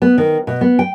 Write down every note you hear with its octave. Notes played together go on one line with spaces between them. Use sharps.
B3
D#3
B2
B3
G5